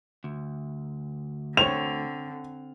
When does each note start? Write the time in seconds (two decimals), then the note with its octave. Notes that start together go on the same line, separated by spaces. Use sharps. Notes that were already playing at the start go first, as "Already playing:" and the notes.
0.24 D2
1.57 D3 C4 C#5 F7